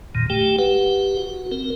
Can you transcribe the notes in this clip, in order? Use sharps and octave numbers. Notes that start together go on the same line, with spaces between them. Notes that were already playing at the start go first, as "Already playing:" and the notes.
F2 A#2 D#3
A3 G4 G5
G4 B4 F#5
F#4
C4 A#4